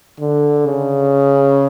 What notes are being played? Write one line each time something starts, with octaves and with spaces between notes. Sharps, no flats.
D3
C#3